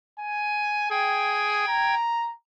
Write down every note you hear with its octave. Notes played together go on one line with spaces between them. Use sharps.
G#5
G#4 G5 G#6
A#5